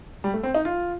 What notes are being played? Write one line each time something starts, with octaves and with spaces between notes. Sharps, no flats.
G3
A3
C4
D#4
F4